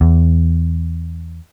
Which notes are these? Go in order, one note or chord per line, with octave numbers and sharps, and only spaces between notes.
E2